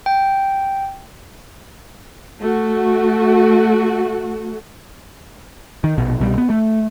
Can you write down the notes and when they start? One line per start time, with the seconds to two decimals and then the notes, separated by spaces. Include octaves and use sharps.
0.06 G5
2.42 A3 F#4
5.84 D#3
5.98 A#1 B2
6.20 C2 B2 G3
6.38 B3
6.50 A3